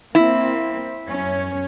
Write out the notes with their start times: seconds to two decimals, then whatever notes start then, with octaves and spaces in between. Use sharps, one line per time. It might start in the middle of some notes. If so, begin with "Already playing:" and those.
0.15 A#3 C4 E4
1.08 F#2 C#4 C#5